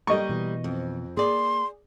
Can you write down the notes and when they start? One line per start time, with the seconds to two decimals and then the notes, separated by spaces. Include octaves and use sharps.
0.07 G3 A#3 D#5 C#6
0.29 B2 E3
0.64 F2
1.17 A#3 G#4 D5 C6